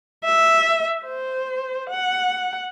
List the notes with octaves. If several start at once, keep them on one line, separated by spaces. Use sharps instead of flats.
E5
C5
F#5